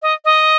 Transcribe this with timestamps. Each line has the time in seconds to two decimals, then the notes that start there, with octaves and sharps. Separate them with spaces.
0.02 D#5
0.25 D#5